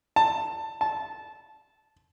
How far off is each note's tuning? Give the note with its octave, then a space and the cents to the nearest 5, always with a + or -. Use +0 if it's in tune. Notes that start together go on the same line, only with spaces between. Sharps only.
A5 +15
A5 -15